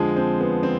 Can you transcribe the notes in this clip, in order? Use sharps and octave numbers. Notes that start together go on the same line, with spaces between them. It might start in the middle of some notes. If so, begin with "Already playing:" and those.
Already playing: F2 D3 F3 G#3
C4
B3
C4